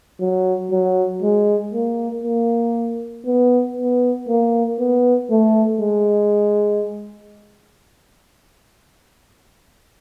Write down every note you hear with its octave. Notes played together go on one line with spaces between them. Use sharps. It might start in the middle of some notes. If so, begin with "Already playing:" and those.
F#3
F#3
G#3
A#3
A#3
B3
B3
A#3
B3
A3
G#3